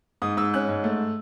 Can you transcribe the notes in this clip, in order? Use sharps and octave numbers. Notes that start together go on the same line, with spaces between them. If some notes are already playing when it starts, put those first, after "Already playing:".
G#2 D#6
G#2 E6
C#4 F#6
G#2
A3